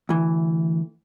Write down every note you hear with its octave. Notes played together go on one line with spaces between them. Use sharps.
D2 E3